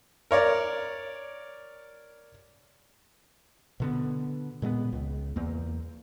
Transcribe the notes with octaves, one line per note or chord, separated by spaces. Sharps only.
A#4 C#5 D5
B2 D3 B3
A#2 G#3 A#3 B3
C#2
E2 A#3